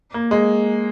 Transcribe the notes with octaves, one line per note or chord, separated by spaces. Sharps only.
A#3
G#3